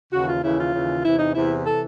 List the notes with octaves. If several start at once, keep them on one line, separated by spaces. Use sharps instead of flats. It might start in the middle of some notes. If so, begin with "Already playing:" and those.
D#2 C#3 E3 F#4
F4
D#2 C#3 E3 E4
F4
D#2 C#3 E3
E2 C3 E3 E4
D#4
E2 C3 E3 E4
C3 E3 A4